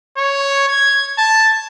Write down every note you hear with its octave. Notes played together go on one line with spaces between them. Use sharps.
C#5
G#6
A5